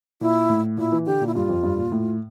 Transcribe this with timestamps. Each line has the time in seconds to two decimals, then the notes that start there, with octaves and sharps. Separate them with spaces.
0.21 A#2 E4
0.49 A2
0.77 A#2 E4
0.92 E3
1.06 D3 G4
1.21 A#2
1.27 E4
1.34 G2 F4
1.49 F2
1.63 G2
1.78 A#2
1.92 A2